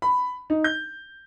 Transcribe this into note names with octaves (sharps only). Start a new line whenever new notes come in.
B5
D#4
G6